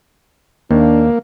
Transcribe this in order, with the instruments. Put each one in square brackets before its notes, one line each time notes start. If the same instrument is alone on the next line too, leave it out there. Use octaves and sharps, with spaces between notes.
[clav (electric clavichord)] D#2 [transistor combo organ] A#3 [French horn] D4